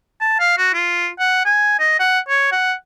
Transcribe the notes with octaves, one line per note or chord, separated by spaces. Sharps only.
A5
F5
F#4
F4
F#5
G#5
D#5
F#5
C#5
F#5